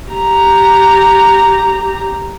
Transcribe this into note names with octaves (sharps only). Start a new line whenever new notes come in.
G4 A#5